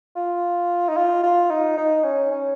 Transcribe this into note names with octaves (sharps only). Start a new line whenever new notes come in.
F4
D#4
F4
F4
D#4
D#4
C#4
C#4